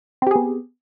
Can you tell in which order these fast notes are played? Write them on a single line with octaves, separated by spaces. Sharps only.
C4 G4 G#4 B3